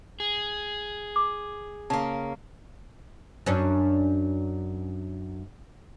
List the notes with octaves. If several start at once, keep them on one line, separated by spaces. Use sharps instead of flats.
G#4
D6
C#3 A#3 A5
F#2 C#4 D4